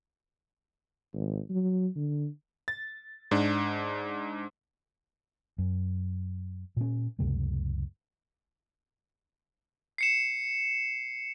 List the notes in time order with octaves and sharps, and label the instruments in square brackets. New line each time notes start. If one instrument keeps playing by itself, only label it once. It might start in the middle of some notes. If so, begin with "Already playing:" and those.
[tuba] G#1
F#3
D3
[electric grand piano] A6
G#2 D4
[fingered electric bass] F#2
A#2 C#4
C#2 F#2 C3 A3
[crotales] C7 C#7 E7